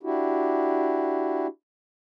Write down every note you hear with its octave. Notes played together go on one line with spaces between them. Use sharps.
D4 E4 F#4 G4